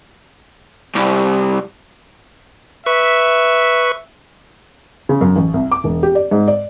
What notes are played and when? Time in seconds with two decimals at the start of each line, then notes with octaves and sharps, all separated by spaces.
0.96 C2
2.86 B4 E5 C#6
5.09 C#3
5.21 F#2
5.36 A1
5.54 C2
5.72 D6
5.84 E1
6.03 G4
6.15 D5
6.31 G#2
6.48 D5